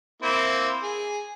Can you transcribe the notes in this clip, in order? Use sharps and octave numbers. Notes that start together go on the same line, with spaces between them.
A#3 C4 E4
G#4